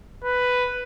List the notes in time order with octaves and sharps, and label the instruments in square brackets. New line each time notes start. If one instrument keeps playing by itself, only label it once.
[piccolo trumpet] B4